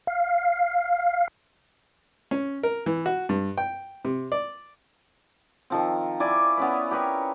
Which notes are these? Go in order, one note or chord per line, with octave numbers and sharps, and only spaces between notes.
F5
C#4
A#4
E3
F#4
G2
G5
C3
D5
D#3 F3 C4
E4 D5 G#5 C#6
B3 C#4 B4
G4 A#4 B4 C#5